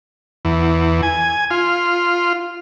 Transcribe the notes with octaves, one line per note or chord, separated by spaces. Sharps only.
E2
G#5
F4